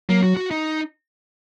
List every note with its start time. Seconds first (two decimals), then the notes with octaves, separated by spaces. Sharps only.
0.09 F#3 A#3
0.23 F#4
0.37 F#4
0.51 D#4